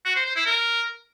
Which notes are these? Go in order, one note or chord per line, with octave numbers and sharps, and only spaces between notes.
F#4
C5
C5
E4
A#4